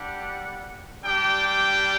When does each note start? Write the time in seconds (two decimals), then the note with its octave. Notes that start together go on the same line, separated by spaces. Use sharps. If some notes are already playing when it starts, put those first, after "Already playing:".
Already playing: G3 D4 G4 F#5
1.02 G3 D4 G4 G5
1.45 G5